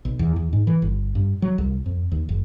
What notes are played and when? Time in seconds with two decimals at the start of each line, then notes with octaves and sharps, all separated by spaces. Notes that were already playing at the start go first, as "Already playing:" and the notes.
0.05 B1
0.19 E2
0.36 E2
0.53 G#2
0.67 E3
0.82 G1
1.15 G2
1.42 F#3
1.58 C2
1.86 F2
2.12 D#2
2.29 F#1